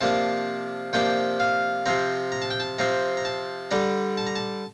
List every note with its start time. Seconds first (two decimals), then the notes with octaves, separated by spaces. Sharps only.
0.01 C3 F3 A#3 D4 A5
0.93 C3 F3 A#3 D4 G5
1.40 F5
1.86 C3 F3 C4 A#5
2.32 A#5
2.42 A5
2.50 G5
2.60 A5
2.78 C3 F3 C4 A#5
3.17 A#5
3.25 A5
3.71 D3 G3 D4 A#5
4.17 A5
4.27 A#5
4.35 A5